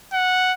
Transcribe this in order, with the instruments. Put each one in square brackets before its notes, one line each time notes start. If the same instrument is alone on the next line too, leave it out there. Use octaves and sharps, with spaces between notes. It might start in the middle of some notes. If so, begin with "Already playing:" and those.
[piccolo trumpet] F#5